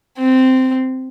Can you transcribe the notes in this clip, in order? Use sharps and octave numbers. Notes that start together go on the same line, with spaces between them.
C4